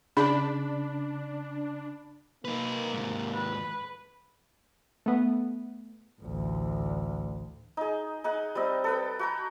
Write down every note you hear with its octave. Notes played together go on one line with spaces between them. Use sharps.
C#3 D4 G#4 B5
A#3 D#4 B4
D#2 G#2
B4
A3 B3
A1 D2
D#4 G#4
D#4 G#4 F#5
G3 C4 D#5
A4 B4 G5
F#4 G5 A#5